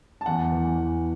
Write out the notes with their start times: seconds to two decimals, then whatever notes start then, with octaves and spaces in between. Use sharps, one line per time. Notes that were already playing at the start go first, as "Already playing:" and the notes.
0.21 A5
0.26 E2 F#5
0.52 E3
0.78 E2